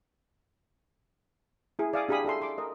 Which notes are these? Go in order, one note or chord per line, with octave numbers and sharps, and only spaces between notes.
E4 G#4
D5 E5 F5 G#5 D6 D#6
D4 G4 G#4 F5 B5 D#6
G#4 A4 E5 C6
C6 D6
A#4 D#5